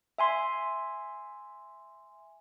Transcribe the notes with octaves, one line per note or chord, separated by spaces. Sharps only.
E5 G#5 C6